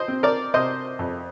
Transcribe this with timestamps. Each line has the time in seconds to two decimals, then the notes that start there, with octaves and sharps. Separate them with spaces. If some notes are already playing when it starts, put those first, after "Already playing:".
Already playing: C5 D#5
0.08 C4
0.23 A#4 D5
0.54 C3 C5 D#5
0.99 F2